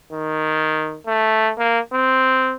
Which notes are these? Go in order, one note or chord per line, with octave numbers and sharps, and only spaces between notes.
D#3
A3
A#3
C4